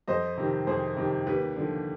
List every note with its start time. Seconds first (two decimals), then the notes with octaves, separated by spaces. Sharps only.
0.08 F2 C5 D#5
0.38 C3 D#3
0.67 F2 G#4 C5
0.97 C3 D#3
1.27 D#2 G4 B4
1.56 D3 F3